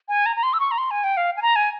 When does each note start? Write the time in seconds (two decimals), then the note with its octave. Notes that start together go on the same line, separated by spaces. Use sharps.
0.09 G#5
0.26 A#5
0.36 A#5
0.43 C6
0.53 E6
0.60 C#6
0.71 A#5
0.78 C6
0.91 G#5
1.04 G5
1.17 F5
1.37 G#5
1.42 A#5
1.56 G#5